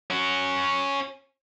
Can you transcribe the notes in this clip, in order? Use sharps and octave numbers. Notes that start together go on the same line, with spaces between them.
C#4 F#4